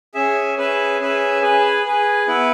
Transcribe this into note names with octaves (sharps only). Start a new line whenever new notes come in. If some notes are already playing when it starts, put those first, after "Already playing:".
C#4 G#4 E5
C#4 G#4 B4 E5 G#5
C#4 G#4 B4 E5 G#5
G#4 B4 G#5
G#4 B4 G#5
B3 E4 B4